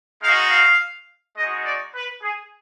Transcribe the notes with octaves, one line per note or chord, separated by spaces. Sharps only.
G#3 D#4 F#4 F5
F5
G#3 D#4 F#4 D#5
D5
B4
G#4